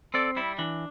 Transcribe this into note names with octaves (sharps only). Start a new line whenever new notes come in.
C4 A4 D5
G3 E4
E3 D4